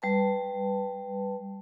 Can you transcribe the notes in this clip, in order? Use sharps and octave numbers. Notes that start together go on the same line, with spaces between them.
G3 B4 A5